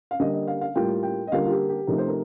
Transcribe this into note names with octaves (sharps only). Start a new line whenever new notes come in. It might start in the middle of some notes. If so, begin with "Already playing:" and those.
F5
D3 G3 A#3 D4 D#5
D#5
F5
F5
A2 G3 A#3 F4 G5
G5
D#5
D3 G3 A#3 F4 F5
F4
G4
G4
C3 F3 A3 D#4 A#4
C5
A#4